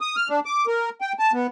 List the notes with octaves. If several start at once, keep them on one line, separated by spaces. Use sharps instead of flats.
D#6
F6
D4
D6
A#4
G5
A5
B3